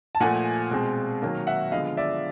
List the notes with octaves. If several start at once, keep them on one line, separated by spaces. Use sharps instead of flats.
A5
A#2 F3 A3 F#5 G#5
B2 G#3 C4
D#3 F#3 A#3
E5 F#5
D3 F3 G#3 B3 D#5 F5
D5 E5